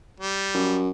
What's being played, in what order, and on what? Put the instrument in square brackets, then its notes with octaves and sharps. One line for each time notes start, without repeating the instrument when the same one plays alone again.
[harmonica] G3
[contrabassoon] F#2